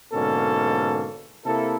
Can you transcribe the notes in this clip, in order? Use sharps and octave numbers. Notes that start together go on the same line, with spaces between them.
G#2 B2 D3 A#3 C#4 A4
C3 A#3 E4 A4